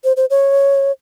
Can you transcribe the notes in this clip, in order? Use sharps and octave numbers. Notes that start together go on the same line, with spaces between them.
C5
C5
C#5